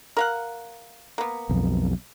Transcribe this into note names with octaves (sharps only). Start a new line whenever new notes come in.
A#4 F5 F#5
A#3 B3
B1 F2